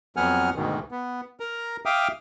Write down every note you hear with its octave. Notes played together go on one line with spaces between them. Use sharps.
F2 F#3 B3 F#5 G#5 F6
D2 G#2 B2 D#3
B3
A#4 A#5
E5 F5 G5 D6 D#6 F6